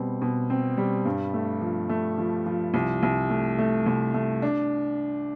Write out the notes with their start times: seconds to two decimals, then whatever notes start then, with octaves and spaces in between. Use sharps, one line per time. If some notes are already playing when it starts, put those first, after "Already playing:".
Already playing: B2 G3 C4
0.22 B2
0.50 C4
0.77 G3
1.05 G2
1.34 A3
1.61 F3
1.89 A3
2.18 F3
2.46 F3
2.74 C2
3.03 C2
3.30 A3
3.58 A3
3.86 C2
4.14 A3
4.42 D4